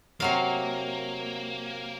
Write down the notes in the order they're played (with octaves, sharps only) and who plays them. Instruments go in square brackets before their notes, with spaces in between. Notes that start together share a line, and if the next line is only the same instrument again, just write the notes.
[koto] C3 F#3 F5 [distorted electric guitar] A#3